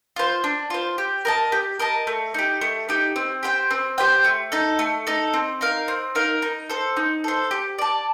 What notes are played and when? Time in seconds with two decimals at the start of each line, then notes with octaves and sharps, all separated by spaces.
0.16 F4 C5
0.44 D4
0.70 F4 C5
0.98 G4
1.25 A#4 D#5 A5
1.52 G4
1.79 A#4 D#5 A5
2.07 A3
2.34 D#4 G4
2.61 A3
2.89 D#4 G4
3.16 C4
3.43 G4 C5 G5
3.71 C4
3.98 G4 C5 G5
4.24 A3
4.52 D#4 A4
4.79 A3
5.07 D#4 A4
5.33 C4
5.61 D#4 A#4 F5
5.88 C4
6.15 D#4 A#4 F5
6.42 D#4
6.70 A4 C5
6.97 D#4
7.24 A4 C5
7.51 G4
7.78 D5 A5